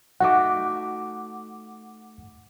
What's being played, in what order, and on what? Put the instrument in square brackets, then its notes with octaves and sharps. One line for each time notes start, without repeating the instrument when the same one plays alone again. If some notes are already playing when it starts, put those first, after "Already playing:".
[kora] A3 D#4 F#4 [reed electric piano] F#5 D6